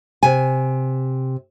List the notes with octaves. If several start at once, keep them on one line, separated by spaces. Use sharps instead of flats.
C3 G#5